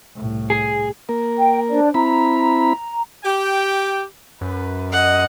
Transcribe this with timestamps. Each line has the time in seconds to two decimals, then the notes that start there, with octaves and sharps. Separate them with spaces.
0.16 C2 A2
0.50 G#4
1.09 A#3 A#4
1.37 G5
1.69 D4 C5 D5
1.94 C4 E4 A#5 B5
3.24 G4 G5
4.41 F#2 B4
4.92 D#5 F#5